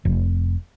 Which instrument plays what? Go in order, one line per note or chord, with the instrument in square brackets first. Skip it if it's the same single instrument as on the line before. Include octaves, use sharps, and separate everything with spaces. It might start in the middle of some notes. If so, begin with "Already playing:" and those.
[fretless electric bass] F1